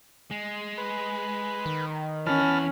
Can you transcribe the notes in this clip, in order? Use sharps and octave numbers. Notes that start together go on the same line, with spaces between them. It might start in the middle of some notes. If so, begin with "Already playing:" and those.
G#3
B4
D#3
E3 C#4 F#5 A5 B5 F6